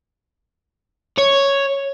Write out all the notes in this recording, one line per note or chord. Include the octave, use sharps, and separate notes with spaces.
C#5